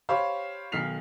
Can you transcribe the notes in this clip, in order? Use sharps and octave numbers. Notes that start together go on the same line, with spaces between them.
G4 C5 C#5 F5 B5
B1 D#3 F6 B6 C7 F7